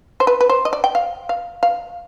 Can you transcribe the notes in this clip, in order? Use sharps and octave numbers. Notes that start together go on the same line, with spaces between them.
C5
B4
B4
C5
D#5
D5
G5
F5
F5
F5